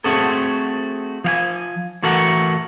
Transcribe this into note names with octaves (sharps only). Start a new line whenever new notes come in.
A3 C4 F#4 G#4 A4
F3 F5 G#5
A2 E3 F#4 A4 A#4 F#5